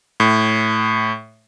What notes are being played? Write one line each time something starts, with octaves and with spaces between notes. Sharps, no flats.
A2